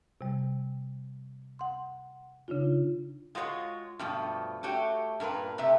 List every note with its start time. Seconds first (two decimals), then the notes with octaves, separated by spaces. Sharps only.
0.21 C3 G3
1.59 F#5 C6
2.48 C#3 D4 D#4 F4
3.35 G#3 F4 F#4 B4 C#5
3.99 G2 B2 F3 A3
4.63 A3 F#4 G4 C#5 G5
5.20 G2 A#2 A#4 B4
5.58 C3 A3 G4 E5